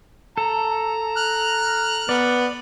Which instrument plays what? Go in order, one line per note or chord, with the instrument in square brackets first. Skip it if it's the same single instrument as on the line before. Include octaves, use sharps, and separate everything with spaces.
[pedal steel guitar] A4 [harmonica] A#5
[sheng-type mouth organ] F6 F#6
[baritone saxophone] B3 [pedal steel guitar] D5